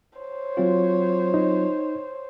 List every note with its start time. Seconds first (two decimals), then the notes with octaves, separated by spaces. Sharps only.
0.18 C5 C#5
0.57 F#3 C4 F4
1.34 D#4